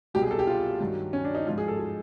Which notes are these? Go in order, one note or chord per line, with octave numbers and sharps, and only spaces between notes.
C2 B2 F#3 G4
G#4
A4
G4
F4
G2 D#3 F#3
C#4
D4
D#4
G#2 F3 F4
G#4
A4
G#4